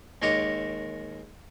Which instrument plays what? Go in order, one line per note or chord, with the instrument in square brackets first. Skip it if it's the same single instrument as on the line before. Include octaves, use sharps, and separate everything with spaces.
[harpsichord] D#2 G#3 A#4 C#5 D6